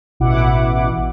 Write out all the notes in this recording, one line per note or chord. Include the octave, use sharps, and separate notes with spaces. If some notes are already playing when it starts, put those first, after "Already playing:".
A1 B2 E4 F#5 D6